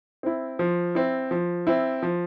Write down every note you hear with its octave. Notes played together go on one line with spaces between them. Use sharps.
C4 E4
F3
C4 E4
F3
C4 E4
F3